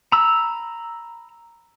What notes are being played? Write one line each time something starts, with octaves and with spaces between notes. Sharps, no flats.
A#5 B5 E6